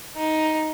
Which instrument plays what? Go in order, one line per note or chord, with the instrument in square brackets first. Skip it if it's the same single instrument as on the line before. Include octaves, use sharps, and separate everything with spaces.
[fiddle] D#4